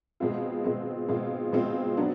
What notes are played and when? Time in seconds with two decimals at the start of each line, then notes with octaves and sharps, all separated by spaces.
0.20 B2 G#3 C4 F4
0.64 B2 G#3 C4 F4
1.09 B2 G#3 C4 F4
1.52 B2 G#3 C4 F4
1.97 F#3 B3 D4